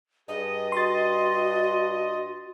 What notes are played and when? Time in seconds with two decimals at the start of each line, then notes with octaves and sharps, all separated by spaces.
0.28 G2 G#4 D#5
0.72 F#4 C6 A6